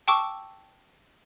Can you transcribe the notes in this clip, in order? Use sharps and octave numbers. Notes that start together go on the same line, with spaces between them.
G5 A5 C#6 D6 E6